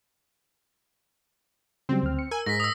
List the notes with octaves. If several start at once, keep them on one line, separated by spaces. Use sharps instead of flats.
C#3 F#3 G3 C4
D2 F6
C#7
A#4 G#5 E6
G#2 A#6 B6
D#6 E6